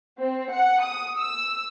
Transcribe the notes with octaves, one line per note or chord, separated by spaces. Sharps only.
C4
F#5
D#6
E6